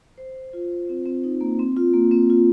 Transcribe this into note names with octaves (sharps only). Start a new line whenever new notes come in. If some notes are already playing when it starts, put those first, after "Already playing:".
C5
F4
C4
C4
D#4
A#3
C4
F4
A#3
C4
F4